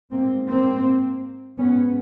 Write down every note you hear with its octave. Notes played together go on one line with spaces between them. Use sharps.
G#2 A#3 C4
A#3 C4
G#2 B3 C#4